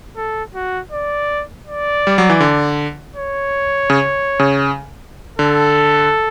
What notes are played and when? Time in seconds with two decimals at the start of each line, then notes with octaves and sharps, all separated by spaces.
0.17 A4
0.55 F#4
0.92 D5
1.66 D5
2.07 G3
2.18 F#3
2.30 E3
2.40 D3
3.16 C#5
3.90 C#3
4.39 C#3
5.39 D3 A4